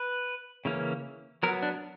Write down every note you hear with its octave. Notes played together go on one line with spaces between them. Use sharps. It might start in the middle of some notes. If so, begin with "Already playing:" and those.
Already playing: B4
C#3 E3 A#3 C#4
F#3 B3 A#4
D4